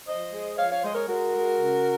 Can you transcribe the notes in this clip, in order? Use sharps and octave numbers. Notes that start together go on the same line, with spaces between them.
F3 C5 D#5
G#3
F3 C#5 F5
C#5 F5
G#3 C5 D#5
A#4 C#5
G#3 F#4 A#4
G#3
C#3